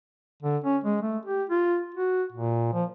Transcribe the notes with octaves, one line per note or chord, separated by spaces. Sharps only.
D3
C#4
G#3
A3
G4
F4
F#4
A#2
F3